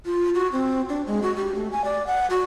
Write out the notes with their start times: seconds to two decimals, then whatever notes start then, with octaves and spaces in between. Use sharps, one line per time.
0.06 F4
0.35 F#4
0.52 C4
0.89 D4
1.07 G#3
1.22 F#4
1.36 G4
1.55 A3
1.72 G#5
1.85 D5
2.07 F#5
2.30 F#4